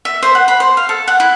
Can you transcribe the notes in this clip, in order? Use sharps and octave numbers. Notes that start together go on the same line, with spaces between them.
E5
C5
F#5
B5
C5
F5
A4
F#5
E4